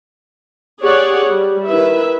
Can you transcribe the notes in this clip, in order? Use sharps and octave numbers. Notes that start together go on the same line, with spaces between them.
G4 G#4 C#5 D5 F#5
G3
D#3 E4 B4 E5